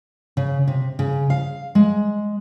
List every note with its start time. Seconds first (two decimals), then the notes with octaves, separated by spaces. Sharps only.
0.37 C#3
0.68 C3
0.99 C#3
1.30 F5
1.75 G#3